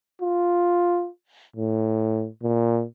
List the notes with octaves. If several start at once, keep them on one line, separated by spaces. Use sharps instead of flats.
F4
A2
A#2